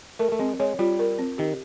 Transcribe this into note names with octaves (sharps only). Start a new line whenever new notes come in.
A3 A#4
A3
G#3 C4
G#3 C#5
G3 F4
A#4
C4
D#3 G4